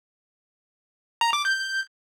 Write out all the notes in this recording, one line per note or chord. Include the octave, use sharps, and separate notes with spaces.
A#5
D6
G6